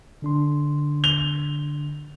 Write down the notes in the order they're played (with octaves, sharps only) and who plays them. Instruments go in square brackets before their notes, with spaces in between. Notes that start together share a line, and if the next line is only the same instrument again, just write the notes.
[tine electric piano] D3 D4 C6
[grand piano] F7 G7